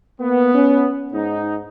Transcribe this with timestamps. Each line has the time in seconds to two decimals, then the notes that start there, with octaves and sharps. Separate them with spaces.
0.20 A#3 B3
0.54 C#4
1.13 G#2 D#4